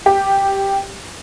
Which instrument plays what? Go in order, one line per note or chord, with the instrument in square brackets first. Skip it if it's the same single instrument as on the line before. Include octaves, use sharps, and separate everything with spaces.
[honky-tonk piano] G4